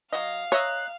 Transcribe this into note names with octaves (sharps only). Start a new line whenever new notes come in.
F#3 D#5 F5
C#5 D#5 E5 A#5 F#6